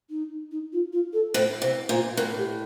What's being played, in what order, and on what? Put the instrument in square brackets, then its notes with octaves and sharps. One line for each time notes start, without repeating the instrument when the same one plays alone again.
[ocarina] D#4
D#4
F4
F4
A4
[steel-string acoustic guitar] A2 [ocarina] C5
[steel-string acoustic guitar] C3 [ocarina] C5
[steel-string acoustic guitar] A#2 [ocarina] C5
[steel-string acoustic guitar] A2 [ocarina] A#4
[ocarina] G4